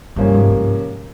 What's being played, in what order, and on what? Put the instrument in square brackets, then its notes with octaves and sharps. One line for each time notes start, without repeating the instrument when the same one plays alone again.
[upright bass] G2 [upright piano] C3 F3 A#3 C#4
[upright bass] G#2
G#2